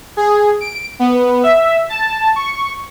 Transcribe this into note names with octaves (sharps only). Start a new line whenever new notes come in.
G#4
D7
B3
E5
A5
C#6